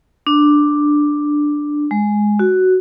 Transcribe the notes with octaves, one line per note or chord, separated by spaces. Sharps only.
D4
G#3
F#4